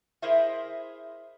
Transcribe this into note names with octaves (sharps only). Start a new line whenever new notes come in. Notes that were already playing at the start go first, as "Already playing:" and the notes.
E4 G#4 A#4 C5 D#5 E5